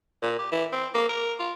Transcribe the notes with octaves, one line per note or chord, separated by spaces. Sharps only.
A#2
G4
E3
C4
A#3
A#4
F4